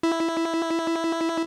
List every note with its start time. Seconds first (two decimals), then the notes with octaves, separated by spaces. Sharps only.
0.03 E4